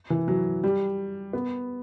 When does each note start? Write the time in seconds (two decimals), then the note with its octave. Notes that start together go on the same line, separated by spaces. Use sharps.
0.10 E3
0.28 F#3
0.64 G3
1.33 B3